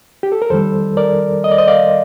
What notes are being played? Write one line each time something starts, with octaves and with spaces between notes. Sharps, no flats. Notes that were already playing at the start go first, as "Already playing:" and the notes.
G4
A4
A#4
F2 D#3 G3 A4 C5
A#4 D5
D#5
D5
C5 D#5
D5 F5